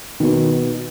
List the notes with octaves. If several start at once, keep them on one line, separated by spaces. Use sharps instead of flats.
B2 D#3